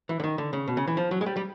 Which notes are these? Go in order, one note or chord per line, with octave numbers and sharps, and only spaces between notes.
E3
D3
D#3
D3
C#3
B2
C#3
E3
F3
F#3
G#3
G3
G3